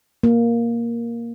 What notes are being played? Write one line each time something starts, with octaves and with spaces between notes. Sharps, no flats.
A#3